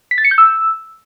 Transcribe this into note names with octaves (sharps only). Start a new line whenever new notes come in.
B6
A6
C#7
G6
E6